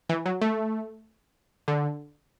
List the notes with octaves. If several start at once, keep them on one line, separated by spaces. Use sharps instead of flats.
E3
F#3
A3
D3